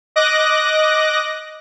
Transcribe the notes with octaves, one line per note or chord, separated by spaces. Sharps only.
D#5 D6 F#6 A#6